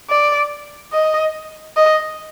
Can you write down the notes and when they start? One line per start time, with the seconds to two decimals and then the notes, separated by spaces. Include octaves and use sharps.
0.10 D5
0.93 D#5
1.77 D#5